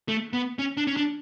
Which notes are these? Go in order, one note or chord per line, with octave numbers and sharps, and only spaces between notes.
A3
B3
C#4
D4
C#4
D4